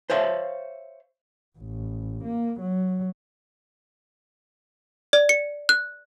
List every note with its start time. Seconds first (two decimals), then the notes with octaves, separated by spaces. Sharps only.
0.10 C5 C#5 E5 F5
1.59 A1
2.24 A#3
2.61 F#3
5.13 D5
5.29 C#7
5.69 F#6